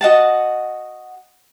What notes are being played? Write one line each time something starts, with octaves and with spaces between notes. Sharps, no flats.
F#4 D#5 F#5 A5